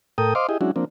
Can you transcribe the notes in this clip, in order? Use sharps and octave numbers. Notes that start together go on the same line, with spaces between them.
A2 A4 A#4 G5 D#6
C5 D#5 F5 C6 D6
E4 G4 G#4 D#5
F#3 G#3 C#4 D4 E4 F#4
F3 A#3 C4 D4